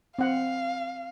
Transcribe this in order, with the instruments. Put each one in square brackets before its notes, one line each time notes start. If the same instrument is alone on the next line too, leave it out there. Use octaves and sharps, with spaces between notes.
[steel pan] C4 F#5 [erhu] F5